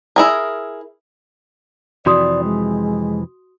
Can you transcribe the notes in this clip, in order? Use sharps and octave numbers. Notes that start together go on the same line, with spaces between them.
E4 G#4 A#4
F2 C3 E3 F#4 D5 C6 D#6
G#3